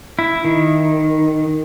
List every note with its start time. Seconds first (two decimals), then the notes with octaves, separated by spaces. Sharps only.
0.19 E4
0.45 D#3